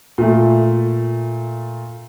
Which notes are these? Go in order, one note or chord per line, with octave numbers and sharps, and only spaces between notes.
A#2 A3